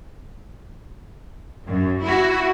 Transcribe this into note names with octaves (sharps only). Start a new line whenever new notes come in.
F#2
E4 F#4